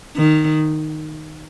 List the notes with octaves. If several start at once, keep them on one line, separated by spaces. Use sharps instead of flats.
D#3